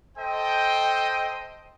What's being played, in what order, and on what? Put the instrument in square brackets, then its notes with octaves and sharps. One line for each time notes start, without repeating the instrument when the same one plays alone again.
[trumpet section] A4 C5 D#5 G5